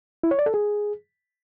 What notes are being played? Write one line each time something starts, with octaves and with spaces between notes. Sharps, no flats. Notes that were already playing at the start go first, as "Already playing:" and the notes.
E4
C#5
D5
A4
G#4